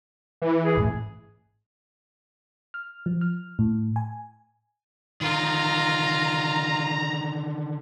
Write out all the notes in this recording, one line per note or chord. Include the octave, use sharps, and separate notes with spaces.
E3
G#4
A1 G#2 A3
F6
F3
F6
A2
G#5
D3 D#3 F4 A#5